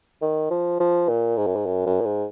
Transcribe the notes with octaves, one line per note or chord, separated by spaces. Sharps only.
D#3
F3
F3
A#2
G#2
F#2
G#2
F#2
F#2
A#2
G#2